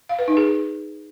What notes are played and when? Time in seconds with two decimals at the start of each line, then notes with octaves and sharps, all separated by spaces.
0.09 F5
0.19 B4
0.28 D#4
0.37 G#4